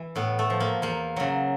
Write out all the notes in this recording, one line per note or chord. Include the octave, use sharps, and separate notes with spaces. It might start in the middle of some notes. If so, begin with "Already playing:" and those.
Already playing: E3
A2 B3
A3
F3
A#3
E2 A#3
C#3 F#3